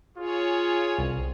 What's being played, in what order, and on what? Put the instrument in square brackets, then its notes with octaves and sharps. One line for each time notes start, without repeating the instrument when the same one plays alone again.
[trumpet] F4 [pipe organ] G#4 C#5
[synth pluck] C2